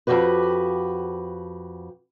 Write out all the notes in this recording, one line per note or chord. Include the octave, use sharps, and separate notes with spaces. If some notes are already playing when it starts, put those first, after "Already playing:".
F2 A#2 F#4 G4 B4